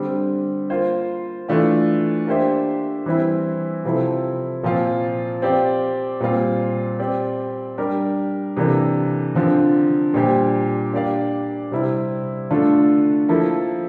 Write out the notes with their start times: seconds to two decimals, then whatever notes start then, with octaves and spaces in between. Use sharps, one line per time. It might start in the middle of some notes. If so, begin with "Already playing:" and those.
Already playing: D3 G3 C4
0.70 A#3 F4 C5
1.48 E3 A3 D4 F4
2.27 A#3 D4 G4 C5 E5
3.06 E3 G3 C4 E4
3.84 C3 F3 C4 E4 A4
4.63 A#2 F3 C4 F4
5.42 C4 G4 D5 F5
6.20 A#2 G3 C4 F4
6.99 C4 G4 D5
7.78 G3 D4 G4 A#4
8.57 C3 E3 A#3 D4 A4
9.35 D3 F3 C4
10.14 A#2 G3 D4 G4 C5
10.93 A#3 D4 G4 D5 F5
11.71 C3 G3 C4 E4
12.51 D3 A3 D4 F4 A4
13.29 F3 A#3 E4 A4